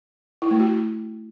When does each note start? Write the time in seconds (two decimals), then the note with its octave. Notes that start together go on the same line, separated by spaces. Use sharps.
0.42 E4
0.51 A3
0.60 F#4